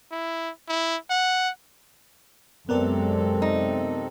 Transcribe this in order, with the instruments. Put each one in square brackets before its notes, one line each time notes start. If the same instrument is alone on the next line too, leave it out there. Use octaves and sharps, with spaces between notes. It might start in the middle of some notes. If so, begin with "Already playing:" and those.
[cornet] E4
E4
F#5
[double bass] F#2 G#3 [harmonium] C3 C4 A4 [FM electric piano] B3 A#4 D5
[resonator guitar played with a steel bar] D#4